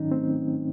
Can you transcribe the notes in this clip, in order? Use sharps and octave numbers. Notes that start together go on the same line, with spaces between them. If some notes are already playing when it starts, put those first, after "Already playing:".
Already playing: G#2 D#3 F#3 C#4 D#4
A3 C4